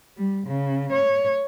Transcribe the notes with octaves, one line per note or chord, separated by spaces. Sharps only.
G3
C#3
C#5